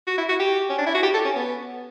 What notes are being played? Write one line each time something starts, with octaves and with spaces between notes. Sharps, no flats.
F#4
E4
F#4
G4
C#4
D4
E4
F#4
G4
A4
C#4
B3